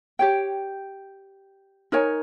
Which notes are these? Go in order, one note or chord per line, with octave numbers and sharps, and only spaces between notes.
G4 C#5 G5
D#4 A#4 C#5 G#5